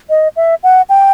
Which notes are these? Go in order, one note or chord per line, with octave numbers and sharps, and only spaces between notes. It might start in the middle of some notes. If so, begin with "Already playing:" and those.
D#5
E5
F#5
G5